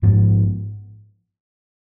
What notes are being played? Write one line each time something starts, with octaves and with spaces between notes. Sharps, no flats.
A#1 G#2 F3 B3